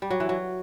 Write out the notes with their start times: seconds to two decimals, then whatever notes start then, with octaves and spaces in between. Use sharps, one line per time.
0.02 G3
0.10 F#3
0.20 E3
0.29 F#3